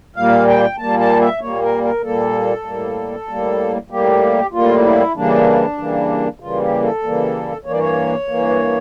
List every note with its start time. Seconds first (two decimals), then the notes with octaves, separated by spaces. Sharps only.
0.16 A#2 G3 A#3 F5
0.48 G5
0.78 A#2 G3 A#3 A5
0.99 A5
1.21 E5
1.41 A#2 G3 A#3 C#5
1.62 A#4
1.83 A#4
2.03 A#2 G3 A#3 A4
2.65 A2 G3 A#3
3.28 A2 G3 A#3
3.90 A2 G3 A#3 G4
4.52 A2 G3 A#3 F4
4.79 F4
4.85 E4
5.15 C#3 E3 G3 A#3 D4
5.78 C#3 E3 G3 A#3
6.40 C#3 E3 G3 A#3 F4
6.61 G4
6.83 A4
7.03 C#3 E3 G3 A#3
7.65 G2 E3 A#3 C#5
7.72 D5
7.79 C#5
8.28 G2 E3 A#3